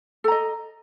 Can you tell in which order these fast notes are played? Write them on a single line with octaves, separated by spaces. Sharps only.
A4 A#5 D#5